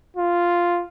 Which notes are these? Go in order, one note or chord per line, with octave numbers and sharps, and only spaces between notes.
F4